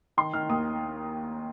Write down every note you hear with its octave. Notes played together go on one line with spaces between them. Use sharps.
D#3 C6
D#3 F6
D#2 D#6